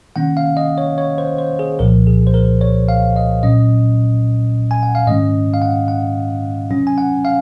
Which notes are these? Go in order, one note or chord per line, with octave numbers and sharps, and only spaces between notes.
C3 D#3 A#3 C#4 F#5
F5
D#5
C#5
C#5
C5
C5
G#4
C2 A#2 F3 A#4
G#4
C5
A#4
C#5
F5
D#5
A#2 F#3 C#4 D#5
G#5
F#5
F5
G#2 D#3 G#3 C#4 D#5
F5
F#5
F#5
C3 F#3 C#4
G#5
F#5
F5